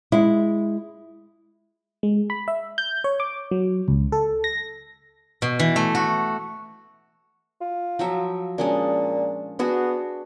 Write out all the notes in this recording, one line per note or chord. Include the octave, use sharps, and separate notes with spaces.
G#3 E4
G#3
B5
E5
G6
C#5
D6
F#3
C#2
A4
A#6
B2
E3
A3
F#4
F4
F3 F#3 E5
A#2 G#3 C#4 D4
B3 D4 F#4 G#4